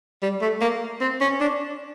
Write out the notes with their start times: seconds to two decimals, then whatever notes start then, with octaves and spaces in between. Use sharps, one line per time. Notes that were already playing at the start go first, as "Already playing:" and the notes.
0.22 G3
0.41 A3
0.61 A#3
1.01 C4
1.21 C#4
1.41 D4